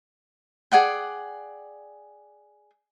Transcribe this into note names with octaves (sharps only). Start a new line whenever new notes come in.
G#4 D5 F#5 G5